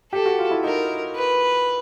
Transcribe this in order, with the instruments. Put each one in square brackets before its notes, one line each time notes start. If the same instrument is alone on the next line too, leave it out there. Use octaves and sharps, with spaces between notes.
[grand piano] G4 [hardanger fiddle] A4
[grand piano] F#4
F4
E4
[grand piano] D#4 [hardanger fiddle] A#4
[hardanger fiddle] B4